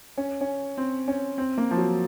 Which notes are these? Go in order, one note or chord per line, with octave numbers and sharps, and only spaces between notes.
C#4
C#4
C4
C#4
C4
A#3
F3
F#3